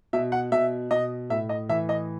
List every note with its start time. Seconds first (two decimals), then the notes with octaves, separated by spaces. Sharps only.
0.13 B2 E5
0.32 F#5
0.52 B2 E5
0.91 B2 D#5
1.30 A2 E5
1.49 D#5
1.69 E3 E5
1.89 D#5